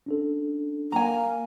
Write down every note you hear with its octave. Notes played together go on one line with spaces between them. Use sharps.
C#4 D4 A4
A#3 G#5 A#5